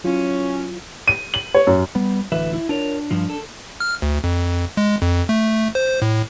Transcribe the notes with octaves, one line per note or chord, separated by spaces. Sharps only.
F#3 C#4 E4 F4
D#7
F#7
C#5
F#2
G3 B3
D1 D2 E3 B4 E5
E4
D4 F4 A#4 C#5
G2 F3
A4
F6
D2
F2
G#3
F2
A3
C5
A2